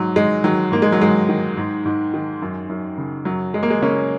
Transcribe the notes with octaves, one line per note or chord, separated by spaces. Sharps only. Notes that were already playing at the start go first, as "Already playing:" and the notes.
Already playing: G#2 F#3
G#2 G#3
D#3 F#3
G#2 A#3
G#3
F#3
G#2 G#3
D#3
G#2
G#2
D#3
F#2
F#2
C#3
F#2 F#3
F#2 G#3
A#3
G#3
C#3 A#3 C#4